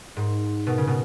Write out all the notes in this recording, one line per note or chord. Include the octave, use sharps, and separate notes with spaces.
G#2
B2
C#3
B2